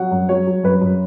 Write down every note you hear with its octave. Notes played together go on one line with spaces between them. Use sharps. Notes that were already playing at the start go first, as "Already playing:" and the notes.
Already playing: F#3 F#5
F#2
F#3 C#5
F#3
F#2 B4
F#2